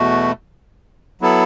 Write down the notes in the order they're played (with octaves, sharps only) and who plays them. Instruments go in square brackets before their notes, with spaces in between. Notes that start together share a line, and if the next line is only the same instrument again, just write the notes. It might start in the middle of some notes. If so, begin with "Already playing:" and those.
Already playing: [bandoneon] E2 B2 A3 F#4
F#3 B3 E4 A4